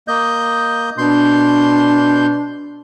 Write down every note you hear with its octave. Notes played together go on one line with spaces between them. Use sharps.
A#3 D#5 G6
B2 D4 C6 G6